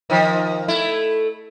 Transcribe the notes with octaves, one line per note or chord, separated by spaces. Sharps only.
D#3 F3
A3 E4